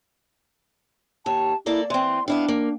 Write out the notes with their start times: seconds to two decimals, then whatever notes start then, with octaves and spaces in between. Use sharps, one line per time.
1.26 D#2 C#5 A5
1.66 A#3 E4 A4 D5
1.90 E3 C4 C6
2.28 B3 D4 E4 F5
2.48 A#3